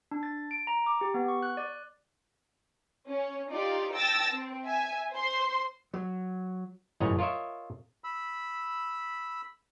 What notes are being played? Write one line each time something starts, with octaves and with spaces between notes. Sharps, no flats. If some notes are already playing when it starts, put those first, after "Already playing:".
D4
A6
D7
A#5
D6
G4
B3
C#6
F#6
D5
C#4
D#4 F4 G4 D5
G5 A5 E6 A6 A#6
C4
E5 G#5
C5 C6
F#3
G1 F#2 A2 C#5 D#5 A#5
F4 A#4 C#5 D#5 E5
B5 E6